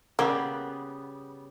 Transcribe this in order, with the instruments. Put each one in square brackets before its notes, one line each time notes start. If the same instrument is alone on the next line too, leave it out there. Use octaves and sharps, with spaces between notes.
[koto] C#3 G3 B3 [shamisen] A#3